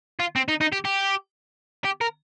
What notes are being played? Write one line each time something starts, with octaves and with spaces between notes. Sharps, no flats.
F4
C4
D#4
D#4
G4
G4
G4
A#4